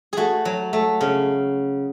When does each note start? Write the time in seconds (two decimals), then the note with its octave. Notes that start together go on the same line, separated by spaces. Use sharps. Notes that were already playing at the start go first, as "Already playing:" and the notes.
0.13 A3 F#4 G#4
0.45 F#3
0.73 A3
1.01 C#3